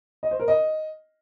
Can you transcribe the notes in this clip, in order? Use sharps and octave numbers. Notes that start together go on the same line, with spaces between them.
D#5
C5
A#4
D#5